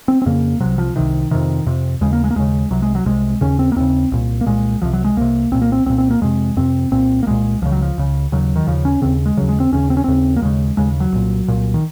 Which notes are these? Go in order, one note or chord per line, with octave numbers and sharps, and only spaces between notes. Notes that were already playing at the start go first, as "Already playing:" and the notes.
C4
C4
F2 C#3 A#3
C2 C3 F#3
F3
C2 C3 D#3
F2 C3 D#3
F2 C3
D#2 C#3 G#3
A#3
G#3
A#3
D#2 C#3 G#3
C2 C3 F#3
G#3
F#3
C2 C3 G#3
D#2 C#3 C#4
C4
A#3
D#2 C#3 C4
C2 A#2
A#3
C2 A#2 G#3
C2 C3 F3
F#3
G#3
C2 C3 A#3
C2 A#2 C4
A#3
C4
C2 A#2 C4
C4
A#3
F2 C3 G#3
F2 C3 C4
C2 A#2 C4
A#3
C2 A#2 G#3
C#2 C#3 F3
F#3
F3
C#2 C#3
D#2 C#3 F#3
D#3
D#2 C#3 F3
C#4
D#2 C#3 C4
G#3
D#2 C#3 F#3
G#3
C4
D#2 C#3 C#4
C4
C#4
D#2 C#3 C4
A#3
D#2 C#3 G#3
D#2 C#3 G#3
F#3
C2 A#2
C2 A#2
D#3